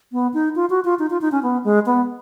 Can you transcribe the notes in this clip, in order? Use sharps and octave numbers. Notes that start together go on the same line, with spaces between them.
B3
D#4
F4
F#4
F4
D#4
F4
D#4
C#4
B3
G#3
B3